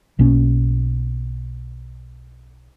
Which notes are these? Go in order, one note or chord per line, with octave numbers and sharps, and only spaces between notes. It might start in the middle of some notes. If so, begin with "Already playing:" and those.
B1 B2 A#3 C#4